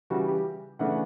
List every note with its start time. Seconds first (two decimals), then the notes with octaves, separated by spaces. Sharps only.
0.10 C#3 E3 G3 F#4
0.28 G4
0.79 C#3 E3 A3 D4 F#5